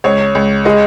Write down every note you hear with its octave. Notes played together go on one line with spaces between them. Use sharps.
C#2 C#5
C#2
G#3 D#5